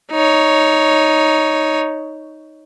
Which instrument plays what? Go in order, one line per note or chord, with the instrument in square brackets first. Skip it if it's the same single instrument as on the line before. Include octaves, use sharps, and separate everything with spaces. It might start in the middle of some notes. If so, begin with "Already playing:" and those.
[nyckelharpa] D#4 C#5